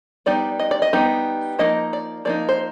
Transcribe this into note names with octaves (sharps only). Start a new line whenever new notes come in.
G3 B3 D#4 D5
D#5
D5
D#5
G3 B3 D#4
F3 A#3 D#4 D#5
D5
F3 A#3 D#4 D5
C5